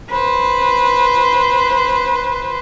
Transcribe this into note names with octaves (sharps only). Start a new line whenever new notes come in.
B4 C5